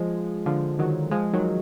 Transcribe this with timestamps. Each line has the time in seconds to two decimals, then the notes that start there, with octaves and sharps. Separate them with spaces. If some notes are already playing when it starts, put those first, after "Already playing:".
Already playing: F3 G#3
0.46 D3 F3
0.79 D#3 F#3
1.11 F3 G#3
1.33 D#3 F#3